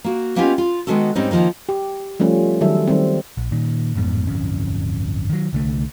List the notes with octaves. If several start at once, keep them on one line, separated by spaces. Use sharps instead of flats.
A#3 F#4
A#3 B3 C#4 D#4 F4 G4
F4
D#3 G#3 B3 C#4 F#4 A4
G#2 G3 C4 C#4 D#4
D#3 F3 A#3 D#4
G4
F3 G3 A3 C#4 F4
D#3 F#3 G3 A4 E5
D#3 G3 C4
A#1
A#2 D#3
A1 F2 G#2 B3
D1 G1 F2 C#4
D#3 F#3
C2 D3 A3